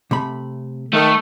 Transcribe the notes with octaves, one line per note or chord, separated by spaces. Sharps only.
C3 A3 B5
D#3 A3